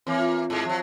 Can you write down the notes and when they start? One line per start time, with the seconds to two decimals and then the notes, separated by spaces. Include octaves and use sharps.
0.07 E3 A#3 C4 C#5
0.19 F4
0.50 G#2 G#3
0.65 F3 F#3